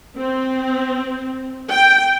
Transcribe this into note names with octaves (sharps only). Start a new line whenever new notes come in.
C4
G5